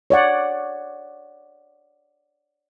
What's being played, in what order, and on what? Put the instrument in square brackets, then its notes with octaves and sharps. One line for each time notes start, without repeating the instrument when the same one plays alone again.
[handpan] C#5 D5 F#5